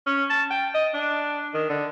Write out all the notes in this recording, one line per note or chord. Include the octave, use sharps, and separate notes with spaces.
C#4
A5
G5
D#5
D4
D#3
D3